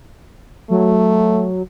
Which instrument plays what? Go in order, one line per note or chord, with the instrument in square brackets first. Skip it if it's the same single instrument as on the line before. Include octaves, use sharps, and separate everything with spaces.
[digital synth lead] F#3 [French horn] A3